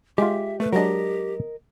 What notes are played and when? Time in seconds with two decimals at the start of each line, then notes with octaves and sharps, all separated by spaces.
0.18 G#3 F4 G4 E5
0.60 A3 B4
0.73 F#3 G#3 D4 G4 A#4 D#5